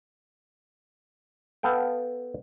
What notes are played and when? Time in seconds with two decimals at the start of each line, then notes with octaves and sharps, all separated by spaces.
1.63 B3 A4 F5 G5